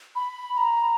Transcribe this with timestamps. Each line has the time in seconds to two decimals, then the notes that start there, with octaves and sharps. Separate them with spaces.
0.16 B5
0.57 A#5